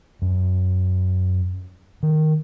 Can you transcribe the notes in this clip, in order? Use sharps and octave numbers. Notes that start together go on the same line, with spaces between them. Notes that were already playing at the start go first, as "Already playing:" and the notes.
F#2
D#3